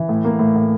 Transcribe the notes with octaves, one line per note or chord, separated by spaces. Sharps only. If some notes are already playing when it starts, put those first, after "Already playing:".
Already playing: E3
A2
A#3
A2
A2